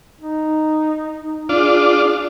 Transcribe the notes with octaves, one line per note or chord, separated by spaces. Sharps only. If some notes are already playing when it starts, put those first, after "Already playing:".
D#4
D4 F4 G#4